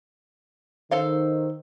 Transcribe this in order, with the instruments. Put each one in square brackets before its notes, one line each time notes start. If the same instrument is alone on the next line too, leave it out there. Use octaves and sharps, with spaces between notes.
[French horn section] D#3 [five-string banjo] A4 C5 F5